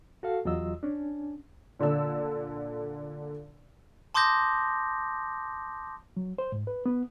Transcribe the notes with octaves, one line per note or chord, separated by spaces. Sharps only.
F#4 A4 F5
E2 F#3 F4 D#5 E6
C#4 D4
A#2 D3 D4 A5 E6
A5 C6 D6 D#6 G6 A#6
F#3
C5
G#2
B4
B3